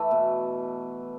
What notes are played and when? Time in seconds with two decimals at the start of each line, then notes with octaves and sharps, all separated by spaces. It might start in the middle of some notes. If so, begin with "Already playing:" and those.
Already playing: E3 A3
0.11 B2